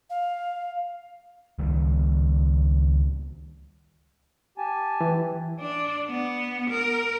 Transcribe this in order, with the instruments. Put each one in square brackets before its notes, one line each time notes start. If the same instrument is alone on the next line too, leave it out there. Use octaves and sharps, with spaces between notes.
[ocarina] F5
[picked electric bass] C#2 D#3 G3
[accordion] G4 G#5 A5
[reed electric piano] E3
[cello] D4
B3
A#4